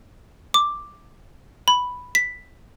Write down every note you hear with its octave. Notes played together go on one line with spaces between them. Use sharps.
D6
B5
B6